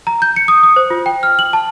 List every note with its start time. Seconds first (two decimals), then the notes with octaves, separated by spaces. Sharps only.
0.07 A#5
0.22 G6
0.36 C#7
0.48 D#6
0.63 D#6
0.76 C5
0.90 F4
1.06 G5
1.23 F6
1.39 F#7
1.53 A5